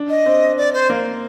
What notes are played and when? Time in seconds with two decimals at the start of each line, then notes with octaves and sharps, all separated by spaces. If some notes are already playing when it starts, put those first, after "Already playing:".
Already playing: D4
0.09 D#5
0.26 C4
0.57 D5
0.74 C5
0.90 A#3